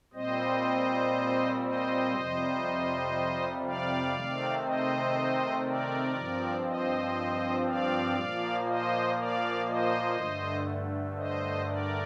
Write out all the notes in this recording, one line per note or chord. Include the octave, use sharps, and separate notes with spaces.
A#2 G3 C4 C5 D#5
C5 D#5
F2 C3 G3
D5 F5
C3 D#3 A3 C4
C5 D#5
A#4 D5
G2 F3 C4
C5 D#5
D5 F5
A#2 F3 A#3
C5 D#5
D5 F5
C5 D#5
G2 D3 A3
C5 D#5
A#4 D5